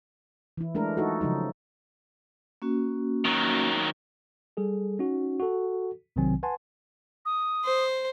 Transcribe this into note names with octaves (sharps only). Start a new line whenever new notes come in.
E3 E4
G#3 A3 D4 A#4
D#4 F4 F#4 A4
C#3 F3 F#3 D#4
A#3 C#4 F#4
D#3 F#3
G3 G#4 A4
C#4 D#4 F#4
F#4 A4
B1 C3 D#3 F#3 C4 G#5
B4 F#5 G#5 A5 C6
D#6
C5